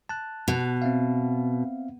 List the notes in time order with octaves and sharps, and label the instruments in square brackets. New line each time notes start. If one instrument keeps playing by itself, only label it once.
[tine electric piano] A5 F#6
[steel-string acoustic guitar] B2
[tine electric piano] C4 E5 F5